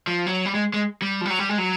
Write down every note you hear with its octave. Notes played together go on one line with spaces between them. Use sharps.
F3
F#3
G3
G#3
G#3
G3
F3
G3
F#3
G3
G#3
F#3